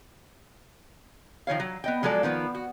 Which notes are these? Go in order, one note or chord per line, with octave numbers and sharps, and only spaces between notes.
D#3 F3 C#5 F5
F#3
B3 D#5 G5
F3 F#3 G#3 A4 D5
D#3 F3 B3
F#4